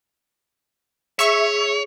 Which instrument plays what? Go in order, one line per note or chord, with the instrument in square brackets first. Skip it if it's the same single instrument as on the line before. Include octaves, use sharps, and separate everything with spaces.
[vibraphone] G#4 [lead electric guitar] C#5 [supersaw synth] E5 C#6